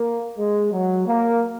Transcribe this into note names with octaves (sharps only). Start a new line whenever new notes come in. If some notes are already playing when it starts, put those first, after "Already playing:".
Already playing: A#3
G#3
F#3
A#3